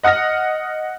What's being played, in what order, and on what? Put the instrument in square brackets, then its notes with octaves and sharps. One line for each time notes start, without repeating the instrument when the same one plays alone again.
[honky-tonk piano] D#5 F#5 D#6 F6 A#6